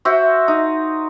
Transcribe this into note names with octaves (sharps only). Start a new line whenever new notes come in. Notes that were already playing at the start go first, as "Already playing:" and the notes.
F#4 C5 E5
D#4